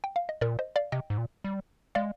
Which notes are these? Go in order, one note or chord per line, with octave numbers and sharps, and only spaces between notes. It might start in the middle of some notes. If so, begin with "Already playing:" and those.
G5
F5
D#5
A#2 A#4 D5
C5 D#5
D5 F5
C3 D#5 G5
G#2
A#2
G3
G#3 D5 F5